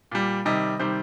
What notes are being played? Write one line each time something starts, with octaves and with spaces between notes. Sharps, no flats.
A#2 G3
C3 D#3 G3 D#5
C3 D#3 G3 C5